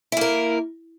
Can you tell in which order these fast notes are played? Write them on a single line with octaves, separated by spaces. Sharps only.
E4 A#3 A#4